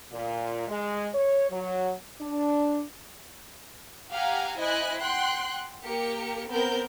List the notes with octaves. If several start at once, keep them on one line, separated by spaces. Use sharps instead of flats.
A#2
G#3
C#5
F#3
D4
G4 F5 F#5 G#5 A#5
E4 C5 D#5 G#5 F#6
F#5 G5 C6 F#6
A#3 G4 A#4 C#7
B3 C4 A#4 G6